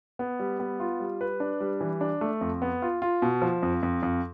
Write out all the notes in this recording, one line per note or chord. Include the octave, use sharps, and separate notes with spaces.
B3
G3
B3
F4
G3
B4
D4
G3
E3
D4
A3
F2
B3
F4
F4
B2
F3
F2
F2
F2